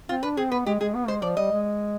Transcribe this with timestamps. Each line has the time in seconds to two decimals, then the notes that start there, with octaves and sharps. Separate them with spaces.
0.09 C4 F4
0.23 D4 B4
0.37 C4 G#4
0.52 B3 B4
0.66 G#3 G4
0.80 G#3 G#4
0.94 B3
1.08 G#3 C5
1.22 F3 D5
1.37 G3 D#5
1.51 G#3